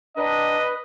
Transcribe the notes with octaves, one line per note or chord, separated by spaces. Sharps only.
D4 B4 D#5 G5 A#5